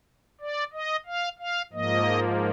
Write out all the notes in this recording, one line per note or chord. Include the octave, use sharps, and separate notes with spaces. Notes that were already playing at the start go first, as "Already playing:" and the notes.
D5
D#5
F5
F5
G#2 F3 A#3 D#5